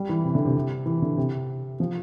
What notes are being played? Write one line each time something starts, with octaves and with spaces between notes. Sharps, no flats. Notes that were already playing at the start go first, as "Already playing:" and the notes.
Already playing: G3
E3
C3
D3
C3
E3
D3
C3
F3